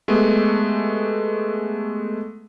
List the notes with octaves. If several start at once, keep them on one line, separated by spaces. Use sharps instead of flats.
G#3 A3 B3 G4